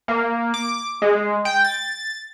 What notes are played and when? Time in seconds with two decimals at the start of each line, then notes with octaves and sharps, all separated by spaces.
0.08 A#3
0.54 D6
1.02 G#3
1.45 G5
1.64 A6